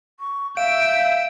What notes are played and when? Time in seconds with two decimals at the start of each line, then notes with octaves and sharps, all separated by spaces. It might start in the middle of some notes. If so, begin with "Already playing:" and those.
0.20 C#6
0.57 E5 F5 E6 G6 D7